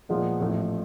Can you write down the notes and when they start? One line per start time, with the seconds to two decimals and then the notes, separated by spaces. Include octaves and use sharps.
0.09 A#2 F3 G#3 B3 D#4
0.40 A1 A2 F3 A3